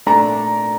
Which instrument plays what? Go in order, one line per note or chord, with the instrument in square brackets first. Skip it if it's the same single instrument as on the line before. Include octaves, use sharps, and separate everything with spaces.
[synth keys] A#2 A3 D4 A4 D5 [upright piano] A#5